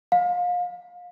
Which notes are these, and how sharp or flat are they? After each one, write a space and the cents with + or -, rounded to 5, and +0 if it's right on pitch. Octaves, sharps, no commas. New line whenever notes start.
F5 +30